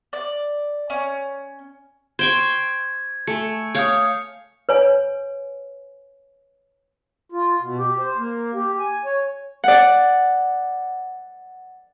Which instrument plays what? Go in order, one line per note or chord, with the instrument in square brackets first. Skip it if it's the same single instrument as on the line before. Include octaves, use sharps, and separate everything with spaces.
[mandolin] D5
C#4
[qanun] C5 G5 C#6 [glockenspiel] G#6
[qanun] A3 [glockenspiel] G#5 C#7
[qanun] C#5 F5 [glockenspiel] D#6 G6 C#7
[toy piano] B4 C#5 G#5
[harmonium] F4
B2
G4
C5
A#3
G4
G#5
C#5
[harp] D5 F#5